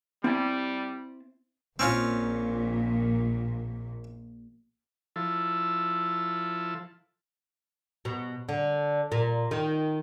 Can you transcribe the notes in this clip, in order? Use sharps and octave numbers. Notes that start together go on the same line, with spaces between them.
G3 C4 E4 A5
A#1 A#2 C4 C#4 F4
F3 E4 A4
B2
D3
A#2
D#3